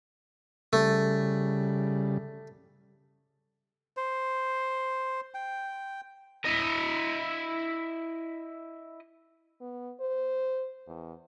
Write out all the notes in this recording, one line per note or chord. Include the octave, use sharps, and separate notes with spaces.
C#3 G3 A3
C5
G5
E4 D#5
B3
C5
E2